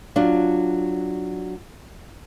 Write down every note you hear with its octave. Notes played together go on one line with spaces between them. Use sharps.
F#3 D4 F4